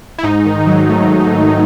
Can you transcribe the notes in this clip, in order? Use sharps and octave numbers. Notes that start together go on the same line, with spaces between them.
E4
G#2 D#4
D#3
F#3
A3